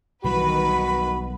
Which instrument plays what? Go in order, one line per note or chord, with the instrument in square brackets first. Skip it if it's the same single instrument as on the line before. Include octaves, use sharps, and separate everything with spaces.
[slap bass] B1 E3 G3 [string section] D#3 B4 [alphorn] F#4 [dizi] B5